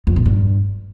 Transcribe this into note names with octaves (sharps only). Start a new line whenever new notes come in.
F2
B2
G2